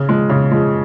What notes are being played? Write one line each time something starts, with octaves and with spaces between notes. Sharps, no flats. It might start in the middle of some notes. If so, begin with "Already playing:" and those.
Already playing: C#3
F3 G#3
C#3
F3 G#3